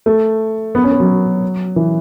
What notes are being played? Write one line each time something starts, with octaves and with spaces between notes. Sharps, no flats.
A3
B3
C#4
B3
F#3
E3